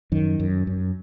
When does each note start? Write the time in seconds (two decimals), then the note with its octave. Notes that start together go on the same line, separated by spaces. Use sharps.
0.12 F#2 D#3
0.40 F#2
0.67 F#2